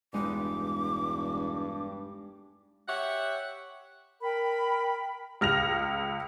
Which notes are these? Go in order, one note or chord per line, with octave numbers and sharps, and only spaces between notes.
E1 G2 G#3 B3 D#4 D6
G4 C#5 E5 F#5
A#4 G5 B5
C#2 F6 A#6 F7